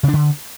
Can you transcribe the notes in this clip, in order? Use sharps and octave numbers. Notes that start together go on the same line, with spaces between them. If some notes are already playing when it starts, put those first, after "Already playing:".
C#3
D4
D3